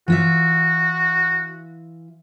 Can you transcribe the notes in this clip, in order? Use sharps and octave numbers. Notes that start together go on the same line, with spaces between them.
E3 F4 F#4 E5